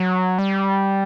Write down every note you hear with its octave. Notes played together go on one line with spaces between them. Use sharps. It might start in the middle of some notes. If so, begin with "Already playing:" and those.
Already playing: F#3
G3